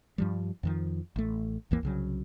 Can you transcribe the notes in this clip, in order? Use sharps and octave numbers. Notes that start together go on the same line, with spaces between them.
G2 F3 G3
F2 D#3 F3
A1 A3
G#1 D#2 E3 A#3
C2 C#3 F#3